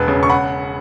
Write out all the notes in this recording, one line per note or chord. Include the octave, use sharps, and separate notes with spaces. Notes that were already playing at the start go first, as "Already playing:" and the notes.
Already playing: E1 B4
C#3
C#6
F#5 B5